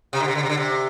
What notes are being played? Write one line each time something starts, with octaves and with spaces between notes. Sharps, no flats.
C3
D3
C3
D3
C3
D3
C3